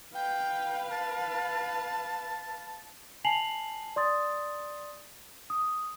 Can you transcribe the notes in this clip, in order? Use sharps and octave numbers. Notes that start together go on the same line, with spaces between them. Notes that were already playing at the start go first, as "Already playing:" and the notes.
B4 F5 G5
A5
G#5 A5 C7 F7 F#7
D5 C6 D#6 A6
D#6